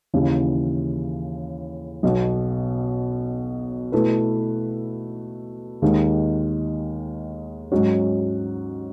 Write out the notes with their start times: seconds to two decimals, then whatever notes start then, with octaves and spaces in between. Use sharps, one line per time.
0.14 D#2 C#3 E3
2.03 B1 B2 F#3 B3
3.92 B2 A3 E4 B4
5.82 D#2 D#3 G#3
7.72 G#2 F#3 C#4 F#4